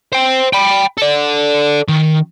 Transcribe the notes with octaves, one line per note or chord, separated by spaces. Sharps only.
C5 G5
G5 B5
A4 D5
D#3